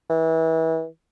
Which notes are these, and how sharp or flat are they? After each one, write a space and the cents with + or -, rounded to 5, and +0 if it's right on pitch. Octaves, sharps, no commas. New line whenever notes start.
E3 -30